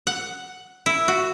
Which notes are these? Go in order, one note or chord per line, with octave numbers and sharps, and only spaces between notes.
F#5
E4
F#4